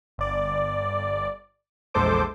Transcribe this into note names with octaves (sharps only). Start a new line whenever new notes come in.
G1 D5
A#1 E2 G#3 A4 C5 D6